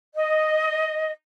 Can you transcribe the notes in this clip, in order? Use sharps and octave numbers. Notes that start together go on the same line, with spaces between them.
D#5